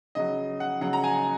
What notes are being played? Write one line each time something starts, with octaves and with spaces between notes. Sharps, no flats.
C#3 F#3 D#5
F#5
C#3 F#3 F#5
A#5
G#5